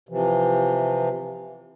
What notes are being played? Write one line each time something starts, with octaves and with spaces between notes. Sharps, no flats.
C3 E3 F3